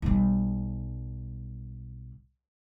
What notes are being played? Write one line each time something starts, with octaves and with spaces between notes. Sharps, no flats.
B1 G3